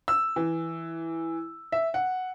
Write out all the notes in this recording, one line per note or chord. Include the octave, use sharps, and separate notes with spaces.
E6
E3
E5
F#5